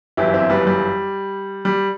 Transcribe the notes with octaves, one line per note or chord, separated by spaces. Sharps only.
G1 F#2 E3 E4 G4
C4 E4
G3 B3
G3
G3